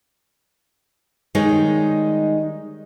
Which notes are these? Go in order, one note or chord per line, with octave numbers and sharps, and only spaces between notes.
D#3 G3 G#3 D#4 C#5